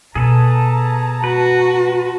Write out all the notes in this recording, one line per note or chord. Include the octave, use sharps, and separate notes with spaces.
B2 G#4 A4 B4 A5 A#5
F#4 B4